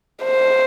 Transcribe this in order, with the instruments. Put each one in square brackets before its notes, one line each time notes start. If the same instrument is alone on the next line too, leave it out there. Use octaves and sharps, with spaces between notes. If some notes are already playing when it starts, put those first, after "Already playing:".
[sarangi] C5